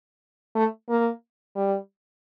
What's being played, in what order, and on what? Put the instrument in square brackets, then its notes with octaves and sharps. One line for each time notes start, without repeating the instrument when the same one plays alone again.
[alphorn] A3
A#3
G3